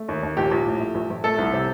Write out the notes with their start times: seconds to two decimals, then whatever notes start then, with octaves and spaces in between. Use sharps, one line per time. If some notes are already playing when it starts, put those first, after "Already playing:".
Already playing: A3
0.08 D#2
0.23 D#2
0.37 A#1 G4
0.51 A#1
0.67 A2
0.80 A3
0.95 A#1
1.10 A#1
1.24 A3 A4
1.38 C2
1.53 C3